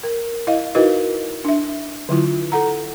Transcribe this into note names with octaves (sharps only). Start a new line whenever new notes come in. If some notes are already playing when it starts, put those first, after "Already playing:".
A#4
E4 D#5 F5
D#4 E4 F#4 A#4 B4 D#5
D4 E5
D3 F#3 E4 F4
A4 F#5 A#5